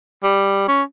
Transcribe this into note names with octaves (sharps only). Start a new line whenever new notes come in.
G3
C#4